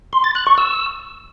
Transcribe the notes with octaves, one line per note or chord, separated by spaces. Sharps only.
C6
A6
F#6
C#6
E6